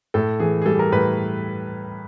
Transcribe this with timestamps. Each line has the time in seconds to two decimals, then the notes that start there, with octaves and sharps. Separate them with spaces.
0.14 A2 A4
0.40 E3 G#4
0.62 G#4
0.66 G3 A4
0.79 A#4
0.92 A2 B4